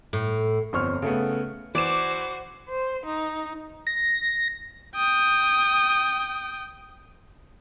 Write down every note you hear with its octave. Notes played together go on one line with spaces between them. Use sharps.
A2
G1 F2 C5 C#5 C#6 F6
C#3 A3 B3
E3 F#4 C5 D5 D6 E7
C5
D#4
A#6
G5 D#6